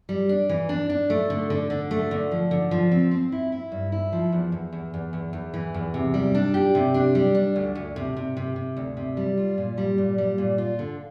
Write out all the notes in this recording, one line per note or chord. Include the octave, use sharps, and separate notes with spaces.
G3
D4
E3
D4
D4
A3
D3
D3
D3
A3
D3
F3
D3
F3
C4
C4
E4
E4
G2
E4
F3
E2
E2
E2
E2
E2
E2
E3
E2
C3
G3
D4
G4
C3
D4
G3
D4
D2
D2
C3
C3
C3
C3
D2
C3
G3
F4
A#2
G3
A#2
G3
A#2
F4
D3